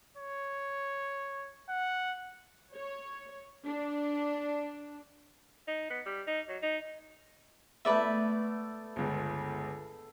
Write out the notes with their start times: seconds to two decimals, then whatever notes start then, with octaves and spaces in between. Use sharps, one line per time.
0.17 C#5
1.69 F#5
2.75 C#5
3.64 D4
5.68 D#4
5.90 B3
6.06 G3
6.27 D#4
6.48 F#3
6.62 D#4
7.85 A3 B3 B4 D5 E5
8.96 G1 C#2